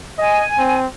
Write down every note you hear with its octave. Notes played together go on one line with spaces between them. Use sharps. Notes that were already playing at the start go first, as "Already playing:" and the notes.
D#5 G#5
C4